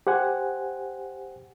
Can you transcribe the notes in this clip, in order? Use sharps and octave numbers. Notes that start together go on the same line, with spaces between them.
G4 C5 F#5 G#5